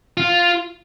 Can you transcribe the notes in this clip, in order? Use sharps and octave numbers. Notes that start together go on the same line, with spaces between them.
F4